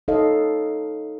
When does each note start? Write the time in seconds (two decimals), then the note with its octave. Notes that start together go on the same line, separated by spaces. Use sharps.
0.08 D#4 A4 C#5 D#5 F5